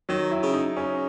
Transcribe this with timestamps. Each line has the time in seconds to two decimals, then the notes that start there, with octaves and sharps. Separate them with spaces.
0.09 D#3 F#3
0.31 E4
0.43 C#3
0.54 D#4
0.77 C#3 C#4